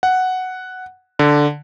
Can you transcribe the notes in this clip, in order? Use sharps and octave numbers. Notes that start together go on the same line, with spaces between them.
F#5
D3